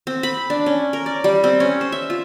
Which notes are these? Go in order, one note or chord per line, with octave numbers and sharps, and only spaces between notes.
C4
B5
D4
C#4
A#4
D5
G3
C4
C#4
C5
E5
F4